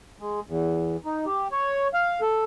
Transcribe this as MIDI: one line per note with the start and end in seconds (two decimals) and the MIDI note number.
0.20 0.40 56
0.47 0.97 40
1.05 1.25 63
1.26 1.48 67
1.52 1.88 73
1.94 2.21 77
2.21 2.44 69